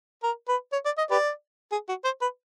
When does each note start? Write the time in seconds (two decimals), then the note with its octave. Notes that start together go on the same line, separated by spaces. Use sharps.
0.23 A#4
0.48 B4
0.72 C#5
0.85 D5
0.98 D#5
1.11 G4 B4 D5
1.72 G#4
1.89 F#4
2.04 C5
2.22 B4